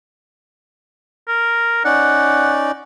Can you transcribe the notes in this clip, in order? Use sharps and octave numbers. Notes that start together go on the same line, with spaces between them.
A#4
C#4 D#4 D5 F#5